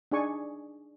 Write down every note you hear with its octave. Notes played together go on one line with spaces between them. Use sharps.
D4 D#4 G#4 D5 G#5 C#6